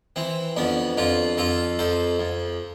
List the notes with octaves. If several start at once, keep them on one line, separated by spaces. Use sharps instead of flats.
E3 C4
F2 B3 D4
F2 D4 F4
F2 F4 A4
F2 A4 C5
F2